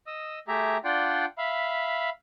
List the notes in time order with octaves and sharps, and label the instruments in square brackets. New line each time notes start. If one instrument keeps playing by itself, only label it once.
[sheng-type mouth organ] D#5 D#6 E6
A3 G4 G#4 E5 A#5
D4 F4 D5 F#5 G5 C6
E5 F5 B5